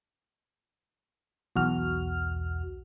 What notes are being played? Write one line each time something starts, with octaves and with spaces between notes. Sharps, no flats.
B1 E2 F#4 F6